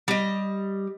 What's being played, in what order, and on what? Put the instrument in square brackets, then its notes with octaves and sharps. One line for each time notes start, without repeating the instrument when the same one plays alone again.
[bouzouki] G3 D#5